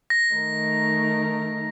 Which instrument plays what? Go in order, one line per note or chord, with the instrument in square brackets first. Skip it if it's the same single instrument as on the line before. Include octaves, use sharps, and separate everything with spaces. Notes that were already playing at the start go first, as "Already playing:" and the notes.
[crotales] A#6
[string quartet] D#3 A3 D#4 A#4